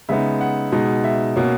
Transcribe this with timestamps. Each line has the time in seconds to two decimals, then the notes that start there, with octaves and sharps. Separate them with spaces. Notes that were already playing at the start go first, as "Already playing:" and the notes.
0.09 C#3 G#3 B3 D#4 E5
0.41 F#5
0.72 B2 G#3 D#4
1.04 E5
1.36 B2 A#3 C#4